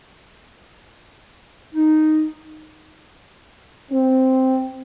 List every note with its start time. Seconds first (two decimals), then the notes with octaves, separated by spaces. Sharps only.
1.75 D#4
3.91 C4